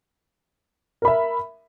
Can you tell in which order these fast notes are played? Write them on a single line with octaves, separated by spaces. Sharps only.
A#4 B5 E5